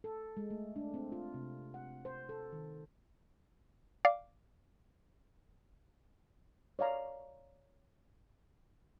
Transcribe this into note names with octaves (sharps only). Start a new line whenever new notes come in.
A4
G#3
A3
D4
C4
F4
C3
F#5
C5
A4
D#3
D5 F5 D6
C#5 D5 F5 A#5